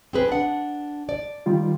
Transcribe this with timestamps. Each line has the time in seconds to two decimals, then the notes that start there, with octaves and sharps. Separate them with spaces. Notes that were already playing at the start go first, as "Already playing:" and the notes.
0.13 C4 G#4 B4
0.28 D4 F#5
1.09 D5
1.46 D#3 G3 F4